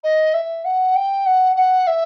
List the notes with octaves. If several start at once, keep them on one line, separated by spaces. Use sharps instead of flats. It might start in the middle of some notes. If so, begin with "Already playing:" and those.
D#5
E5
F#5
G5
F#5
F#5
E5